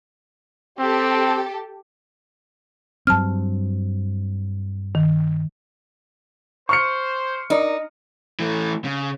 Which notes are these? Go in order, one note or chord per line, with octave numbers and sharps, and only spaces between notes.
C4 G4 A4
G2 F#3 C4 A5 F6
D#3
C5 C#6 F6 C#7
D#4 A#4 D5
E3 A3
C#3